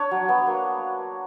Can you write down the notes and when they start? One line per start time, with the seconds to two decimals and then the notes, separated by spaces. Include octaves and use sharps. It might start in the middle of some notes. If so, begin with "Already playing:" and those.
Already playing: D4 C#5
0.11 F#3
0.29 B3
0.47 A#3